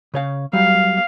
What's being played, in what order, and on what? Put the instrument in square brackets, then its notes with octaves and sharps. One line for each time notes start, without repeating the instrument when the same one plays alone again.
[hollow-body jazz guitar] C#3 C#5 F5
[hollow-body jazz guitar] F#3 G3 [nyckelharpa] F5